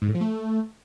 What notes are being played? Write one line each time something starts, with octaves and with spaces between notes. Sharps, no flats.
G#2
A2
F3
A3